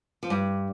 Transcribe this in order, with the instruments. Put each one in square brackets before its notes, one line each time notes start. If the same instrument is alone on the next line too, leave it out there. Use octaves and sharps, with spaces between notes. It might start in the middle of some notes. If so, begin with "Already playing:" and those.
[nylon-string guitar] F3
G2 G3